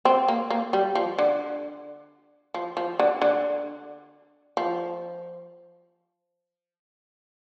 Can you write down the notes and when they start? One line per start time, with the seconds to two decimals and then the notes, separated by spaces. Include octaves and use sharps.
0.05 C4
0.28 A#3
0.50 A#3
0.73 G3
0.95 F3
1.19 D3
2.54 F3
2.77 F3
3.00 D3
3.22 D3
4.57 F3